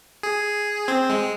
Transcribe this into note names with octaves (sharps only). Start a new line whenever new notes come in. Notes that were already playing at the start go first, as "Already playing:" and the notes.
G#4
C4
G#3